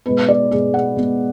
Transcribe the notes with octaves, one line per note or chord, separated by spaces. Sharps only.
B2 G#3 B3 B4
D5
B2 G#3 B3 G#4
F#5
B2 G#3 B3